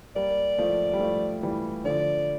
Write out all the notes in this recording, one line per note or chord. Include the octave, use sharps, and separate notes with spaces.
G3 A#3 D5
F3 A3
G3
F3 A3
E3 G3
D3 F3 D5